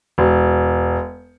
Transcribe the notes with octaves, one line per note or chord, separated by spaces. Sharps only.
E1